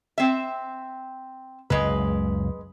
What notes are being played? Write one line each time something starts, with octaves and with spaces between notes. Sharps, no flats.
C4 E5
F#1 C#2 G#3 B4